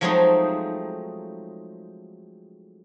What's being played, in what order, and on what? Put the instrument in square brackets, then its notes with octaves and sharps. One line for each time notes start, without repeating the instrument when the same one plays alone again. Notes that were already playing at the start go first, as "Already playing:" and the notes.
[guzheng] F3 F#3 G#3 A3 C4 D#4